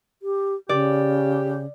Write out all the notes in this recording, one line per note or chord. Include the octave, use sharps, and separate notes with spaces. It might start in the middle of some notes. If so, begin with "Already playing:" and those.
G4
C#3 G4 D5